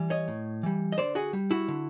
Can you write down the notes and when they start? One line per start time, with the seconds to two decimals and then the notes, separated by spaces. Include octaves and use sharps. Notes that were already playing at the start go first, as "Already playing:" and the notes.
Already playing: E3 G3
0.10 C#5 D#5
0.28 A2
0.63 E3 G3
0.92 D#5
0.98 D3 C5 D5
1.15 F#4 G#4
1.33 G3
1.51 E4 F#4
1.68 D3